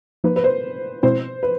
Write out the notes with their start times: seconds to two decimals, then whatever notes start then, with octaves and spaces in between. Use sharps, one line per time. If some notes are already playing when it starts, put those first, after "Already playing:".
0.24 F3 A#3 D#4 B4
0.36 B4
0.44 C5
1.03 B2 G#3 C4 E4 C5
1.43 B4